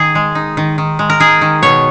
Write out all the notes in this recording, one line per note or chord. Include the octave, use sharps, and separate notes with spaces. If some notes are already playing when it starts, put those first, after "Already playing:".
Already playing: D#3 G#4
G#3
D#4
D#3
D#3
G#3
A#4
D#4 G#4
D#3
B2 C#5